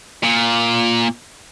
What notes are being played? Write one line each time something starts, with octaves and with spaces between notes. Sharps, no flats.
A#2